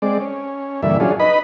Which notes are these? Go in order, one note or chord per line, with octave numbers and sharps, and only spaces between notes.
G#3 C4 D5
C#4
G2 A#2 D3 E3 E5
F#3 C#4 D4 F4 G#4
D#4 B4 D#5 B5